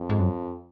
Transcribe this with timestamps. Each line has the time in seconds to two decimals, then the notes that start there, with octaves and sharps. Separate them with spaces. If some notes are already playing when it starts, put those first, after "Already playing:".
Already playing: F2
0.09 G#2
0.19 F#2